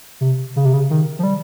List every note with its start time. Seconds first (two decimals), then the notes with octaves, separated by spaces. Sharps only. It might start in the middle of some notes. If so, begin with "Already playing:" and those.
0.21 C3
0.56 C#3
0.65 C3
0.73 C#3
0.90 D#3
1.19 F3
1.23 G3